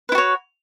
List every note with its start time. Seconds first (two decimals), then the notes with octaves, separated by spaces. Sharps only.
0.09 B4
0.12 E4
0.15 F#4
0.18 C#5